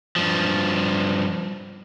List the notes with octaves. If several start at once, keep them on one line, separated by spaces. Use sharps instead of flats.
G2 F3